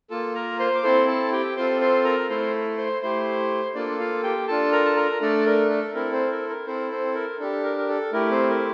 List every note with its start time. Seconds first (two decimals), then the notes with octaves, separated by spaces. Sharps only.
0.10 A#3 F4 A4 A5
0.35 A#4 A#5
0.59 C5 C6
0.75 D6
0.83 C4 E4 A4 C5 C6
1.07 A4 A5
1.32 G4 G5
1.57 C4 F4 A4 C5 C6
1.81 C5 C6
2.05 A#4 A#5
2.29 A3 E4 A4 C5 C6
2.78 C5 C6
3.02 A3 E4 G4 C5 C6
3.75 A#3 D4 F4 A4 D5
3.99 F4 F5
4.23 G4 G5
4.48 D4 F4 A4 A5
4.72 A#4 A#5
4.85 A5
4.96 A#4 A#5
5.21 A3 D4 A4 D5
5.46 A#4
5.70 A4
5.94 C4 E4 A4 A#4
6.12 C4 C5
6.31 A#4
6.49 A#4
6.66 C4 E4 A4 C5
6.92 C4 C5
7.15 A#4
7.39 D4 G4 A4
7.64 A#4
7.78 A#4
7.89 A4
8.12 A3 E4 G4 A#4
8.31 C4 C5
8.50 A#4